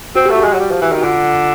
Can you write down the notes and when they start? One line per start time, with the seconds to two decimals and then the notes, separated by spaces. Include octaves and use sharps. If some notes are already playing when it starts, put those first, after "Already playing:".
0.15 C4 F#4
0.26 A3 G4
0.36 A3 F#4
0.44 G#3
0.53 F#3
0.59 G3
0.71 F3
0.81 E3
0.92 D#3
0.98 F#4
1.03 D3 F4